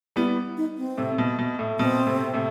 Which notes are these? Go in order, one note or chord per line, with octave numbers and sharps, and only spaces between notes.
G3 B3 E4
D#4
C4
A2 C3
B2
B2
A2
B2 C4
A2 C3
A2 C3